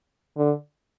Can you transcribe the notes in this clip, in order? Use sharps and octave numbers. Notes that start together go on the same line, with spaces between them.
D3